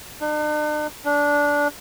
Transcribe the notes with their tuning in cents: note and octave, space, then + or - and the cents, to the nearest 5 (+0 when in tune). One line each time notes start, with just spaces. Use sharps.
D4 +45
D4 -15